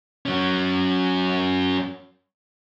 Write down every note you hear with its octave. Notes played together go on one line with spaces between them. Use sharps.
F#3 C#4